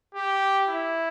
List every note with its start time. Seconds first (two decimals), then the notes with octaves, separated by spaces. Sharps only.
0.15 G4
0.68 E4